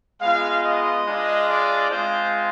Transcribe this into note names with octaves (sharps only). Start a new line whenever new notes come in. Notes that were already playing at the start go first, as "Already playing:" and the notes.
G#3 B3 F4 F5
D#5
G#3 D4 F4
D5
G#3 C4 F4 C5